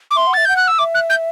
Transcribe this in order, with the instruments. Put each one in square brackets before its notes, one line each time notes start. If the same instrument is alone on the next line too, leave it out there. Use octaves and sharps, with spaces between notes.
[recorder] D6
[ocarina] E5 [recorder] C6
[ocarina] F#5
[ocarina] E5 [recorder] A6
[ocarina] F#5 [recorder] G6
[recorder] F#6
E6
[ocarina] E5 [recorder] D6
[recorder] F#6
G6